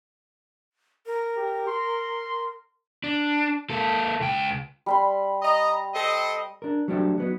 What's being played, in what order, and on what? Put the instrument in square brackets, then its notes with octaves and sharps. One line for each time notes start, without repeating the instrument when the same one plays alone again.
[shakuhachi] A#4
[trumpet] G4
C6
[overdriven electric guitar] D4
A#3 A4
C#2 G5
[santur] G3 B5 C6
[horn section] D#5 A#5
C4 A4 D#5
[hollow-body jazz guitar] D4 A#4
F#3 G3 A3 C4 D4 G4
F#3 B3 D#4